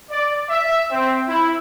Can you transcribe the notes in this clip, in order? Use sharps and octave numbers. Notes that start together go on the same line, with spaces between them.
D5
E5
C4
E4